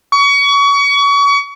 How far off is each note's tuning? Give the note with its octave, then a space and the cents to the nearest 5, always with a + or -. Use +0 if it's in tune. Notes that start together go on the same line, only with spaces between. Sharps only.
C#6 +30